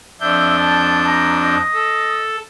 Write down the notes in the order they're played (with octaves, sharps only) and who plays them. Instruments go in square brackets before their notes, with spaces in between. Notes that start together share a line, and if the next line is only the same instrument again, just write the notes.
[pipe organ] F2 D4 G6 [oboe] E5
[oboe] A5
A#5
D#5
[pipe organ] A4